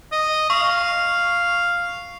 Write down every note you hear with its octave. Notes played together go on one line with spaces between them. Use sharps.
D#5
F5 C#6